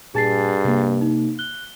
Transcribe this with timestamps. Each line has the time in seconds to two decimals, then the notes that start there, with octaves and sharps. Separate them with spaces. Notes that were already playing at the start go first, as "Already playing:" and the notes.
0.15 G2 A#2 G#4 G#5 A5 A6 C7
0.65 C3 A#3
1.01 D#4
1.39 F#6 G7